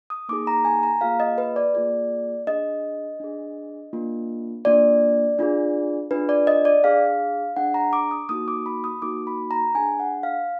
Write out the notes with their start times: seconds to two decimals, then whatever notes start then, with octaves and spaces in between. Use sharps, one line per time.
0.10 D#6
0.29 A#3 D#4 G#4 D6
0.47 A#5
0.65 G#5
0.83 A#5
1.01 A#3 F4 G#4 F5
1.20 D#5
1.38 B4
1.56 D5
1.74 A#3 F4 G#4 D5
2.47 D4 G#4 D#5
3.20 D4 G#4
3.93 A#3 D4 F4
4.65 A#3 D4 F4 D5
5.39 D4 F4 G#4
6.11 D4 F4 G#4 B4
6.29 D5
6.47 D#5
6.65 D5
6.84 D4 G#4 F5
7.57 D4 G#4 F#5
7.74 A#5
7.93 D6
8.11 D#6
8.29 A#3 D#4 F#4 D#6
8.48 D6
8.66 B5
8.84 D#6
9.02 A#3 D#4 F#4 D6
9.27 B5
9.51 A#5
9.75 D4 G#4 G#5
10.00 F#5
10.23 F5